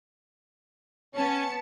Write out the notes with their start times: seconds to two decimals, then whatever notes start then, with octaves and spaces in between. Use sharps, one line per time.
1.14 B3 C#4 A5 C#7